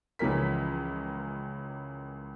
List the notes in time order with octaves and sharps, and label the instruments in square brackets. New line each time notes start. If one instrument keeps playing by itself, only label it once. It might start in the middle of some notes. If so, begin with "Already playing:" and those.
[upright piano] C#2 E3 F3 C#4 A#4 B6